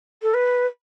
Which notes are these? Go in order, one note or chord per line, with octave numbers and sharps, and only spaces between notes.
A4
B4